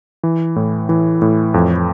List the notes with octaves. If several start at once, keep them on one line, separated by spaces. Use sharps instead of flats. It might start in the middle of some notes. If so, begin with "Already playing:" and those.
E3
A2
E3
A2
F2